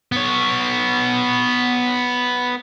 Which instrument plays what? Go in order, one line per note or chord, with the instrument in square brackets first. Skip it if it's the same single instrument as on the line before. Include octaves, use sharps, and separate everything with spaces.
[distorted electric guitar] B3 C#5